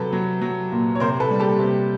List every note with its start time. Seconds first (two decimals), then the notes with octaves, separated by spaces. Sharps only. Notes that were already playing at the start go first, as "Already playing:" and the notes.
Already playing: C3 F#3 A4 B4
0.13 F#3
0.42 F#3
0.72 A#2
0.95 C#5
1.00 C3 A#4 C5
1.20 A4 B4
1.31 G3
1.40 G4 A4
1.59 C3